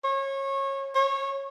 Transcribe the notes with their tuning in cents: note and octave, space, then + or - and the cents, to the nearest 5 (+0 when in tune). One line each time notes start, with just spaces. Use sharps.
C#5 -25
C#5 -20